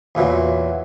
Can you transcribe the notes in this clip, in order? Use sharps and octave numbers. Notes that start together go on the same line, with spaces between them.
E2 A#2 E3 F#3